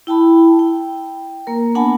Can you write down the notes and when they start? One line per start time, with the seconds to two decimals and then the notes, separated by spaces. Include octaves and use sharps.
0.07 E4 G5 A5 B5
0.59 G5
1.47 A#3 A#4
1.75 B3 D4 F#5 G#5 A5 B5